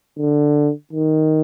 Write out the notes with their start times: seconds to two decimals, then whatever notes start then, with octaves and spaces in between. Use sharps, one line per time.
0.18 D3
0.93 D#3